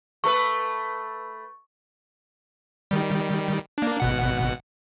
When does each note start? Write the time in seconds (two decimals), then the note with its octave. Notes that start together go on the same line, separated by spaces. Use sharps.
0.24 A3 A4 B4 C#6
2.91 D#3 G3
3.78 A#3 D4
4.00 G#1 B2 F#5